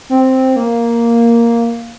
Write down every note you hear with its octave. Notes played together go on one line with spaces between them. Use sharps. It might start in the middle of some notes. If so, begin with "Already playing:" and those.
C4
A#3